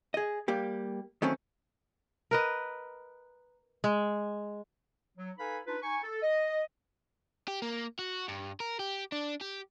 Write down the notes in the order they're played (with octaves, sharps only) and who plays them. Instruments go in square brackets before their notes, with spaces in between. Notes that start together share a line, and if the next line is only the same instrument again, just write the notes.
[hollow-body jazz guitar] G#4 D#5
G3 A#3 G4
D#3 F#3 A3 C4 C#4
[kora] A#4 B4 D#5
G#3
[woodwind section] F#3
D#4 A4 B4 F5 G#5 B5
D4 D#4 F4 B4
D#4 G#5 C#6
A4
D#5
[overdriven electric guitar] G4
A#3
F#4
G2
A#4
G4
D4
G4